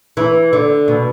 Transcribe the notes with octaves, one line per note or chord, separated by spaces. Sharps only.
E3
D3
B2